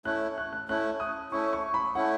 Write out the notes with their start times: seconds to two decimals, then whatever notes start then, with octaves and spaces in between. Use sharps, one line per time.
0.05 A3 C#4 E4 F#6
0.38 F#6
0.53 F#6
0.69 A3 C#4 E4 F#6
1.00 D#6
1.32 A3 C#4 E4 C#6
1.53 C#6
1.74 B5
1.95 A3 C#4 E4 F#5